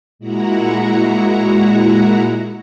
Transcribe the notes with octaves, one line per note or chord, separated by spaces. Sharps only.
A#2 G#3 E4 F#4 F#5 A#5